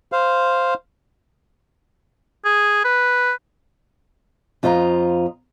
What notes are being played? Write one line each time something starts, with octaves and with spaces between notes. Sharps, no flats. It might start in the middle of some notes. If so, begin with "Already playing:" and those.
C5 F5
G#4
B4
F2 F4 C5 D#5 A#5